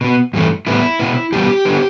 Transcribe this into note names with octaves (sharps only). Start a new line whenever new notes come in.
B2 B3
G2 E3 A3
A2 G3 B3 E4
B2 B3
E2 B2 G3 B3 G4
D3 B3